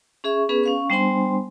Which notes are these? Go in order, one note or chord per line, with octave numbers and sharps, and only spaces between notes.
C#4 G#4 E5 C#6
B3 C#4 G#4 B4
C#4 F5 C#6
G3 B3 D4 C5 G#5 C6